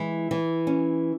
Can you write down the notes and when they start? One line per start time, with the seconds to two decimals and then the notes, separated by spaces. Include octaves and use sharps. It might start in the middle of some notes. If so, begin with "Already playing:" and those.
Already playing: E3 G#3 E4
0.31 E3
0.67 C#4